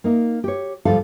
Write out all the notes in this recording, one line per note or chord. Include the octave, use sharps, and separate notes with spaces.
A#3 D#4
G4 C#5
D2 G#2 F3 G3 A4 F5